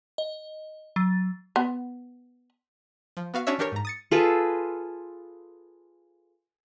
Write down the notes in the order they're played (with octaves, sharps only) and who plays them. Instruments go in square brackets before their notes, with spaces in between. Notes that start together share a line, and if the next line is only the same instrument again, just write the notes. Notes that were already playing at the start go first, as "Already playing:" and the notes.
[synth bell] D#5
F#3 A6
[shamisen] B3
[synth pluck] F3
B3 F#4 F5
C#4 D4 F#4 C#5 E5
E3 D4 G4 A#4 C#5
G#2 A#5
D#6 A6 C#7
[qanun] F4 G#4 A4 B4